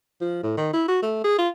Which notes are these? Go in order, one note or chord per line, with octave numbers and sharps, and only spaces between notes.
F3
A2
D#3
E4
F#4
A3
G#4
F4